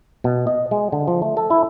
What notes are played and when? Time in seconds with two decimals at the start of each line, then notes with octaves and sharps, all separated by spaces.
0.24 B2
0.47 D#5
0.71 G#3
0.92 D3
1.08 F3
1.22 A3
1.37 A4
1.50 E4